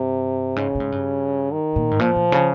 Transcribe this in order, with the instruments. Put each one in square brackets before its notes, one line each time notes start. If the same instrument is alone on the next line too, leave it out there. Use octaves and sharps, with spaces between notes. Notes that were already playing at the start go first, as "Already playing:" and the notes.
Already playing: [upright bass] G2 [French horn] C3
[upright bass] G#2 [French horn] C#3
[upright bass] A#2
G#2
G2
[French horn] D#3
[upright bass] A#2
G#2
[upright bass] A#2 [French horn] F3
[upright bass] A#2
C#3